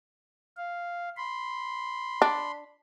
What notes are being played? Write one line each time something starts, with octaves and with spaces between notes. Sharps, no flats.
F5
B5 C6
D4